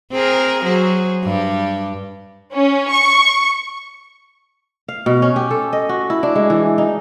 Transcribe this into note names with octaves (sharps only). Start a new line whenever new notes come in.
C4 G#4 A#4
F#3 G#4 C5
G2 G4
C#4
C#6
F5
B2
C#4
G4
A4
D#5
F#4
E4
D4
G#3
E3
D#4